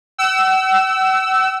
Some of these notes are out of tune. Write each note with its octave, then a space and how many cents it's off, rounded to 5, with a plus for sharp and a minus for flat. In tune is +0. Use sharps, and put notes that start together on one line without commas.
F#5 +45 E6 +0